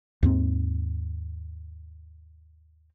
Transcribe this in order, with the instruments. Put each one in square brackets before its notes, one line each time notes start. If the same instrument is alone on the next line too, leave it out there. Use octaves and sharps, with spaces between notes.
[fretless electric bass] D#2 G#2 C4